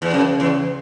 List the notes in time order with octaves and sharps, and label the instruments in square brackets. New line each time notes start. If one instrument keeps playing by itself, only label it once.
[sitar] E2
[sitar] F#2 [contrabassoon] C#3
[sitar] E2